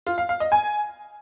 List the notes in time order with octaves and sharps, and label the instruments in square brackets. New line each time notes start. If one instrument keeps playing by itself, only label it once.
[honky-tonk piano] F4
F5
F5
D#5
G#5